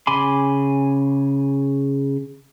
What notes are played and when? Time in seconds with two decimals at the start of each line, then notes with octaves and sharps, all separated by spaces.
0.07 C#3 G#5 B5 C6 D6